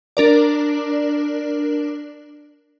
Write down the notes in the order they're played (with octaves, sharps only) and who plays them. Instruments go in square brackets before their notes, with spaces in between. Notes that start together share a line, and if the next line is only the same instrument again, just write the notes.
[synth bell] D4 A#4 D5